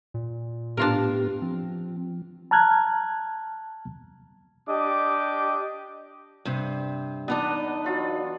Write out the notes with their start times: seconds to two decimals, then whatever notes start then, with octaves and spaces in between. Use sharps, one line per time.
0.14 A#2
0.77 A2 B3 D4 F4 G4 A#4
1.42 F3 C4
2.51 A5 A#5 F6 F#6 G#6
4.68 D4 G4 D#5 D6
6.45 G2 C3
7.28 E2 B3 D4 D#4 D#5
7.84 F#3 F4 F#5